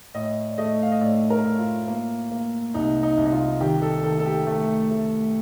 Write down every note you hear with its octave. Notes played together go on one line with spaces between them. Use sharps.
A2 D#5
D5
A3 D#5
F5
D#5
A2 D5
A#4
A2
F4
A#3
A#3
C2 D#4
D#4
C2
D#4
F4
D#3 G4
A4
D#3 A4
A4
G4
A3
A3